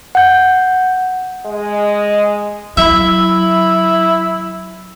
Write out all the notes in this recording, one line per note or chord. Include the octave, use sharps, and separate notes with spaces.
F#5 G6
G#3 D#5
F#3 E4 E5 B5 E6